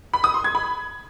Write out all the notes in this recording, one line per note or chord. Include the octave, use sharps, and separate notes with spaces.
B5
D#6
C6
G#6
B5